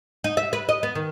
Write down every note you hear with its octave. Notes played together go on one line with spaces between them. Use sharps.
D#4
E5
B4
D#5
B3
D#3